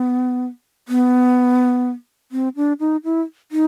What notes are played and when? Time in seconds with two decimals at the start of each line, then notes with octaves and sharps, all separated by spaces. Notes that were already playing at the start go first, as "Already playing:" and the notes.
Already playing: B3
0.88 B3
2.32 C4
2.56 D4
2.80 D#4
3.04 E4
3.52 D#4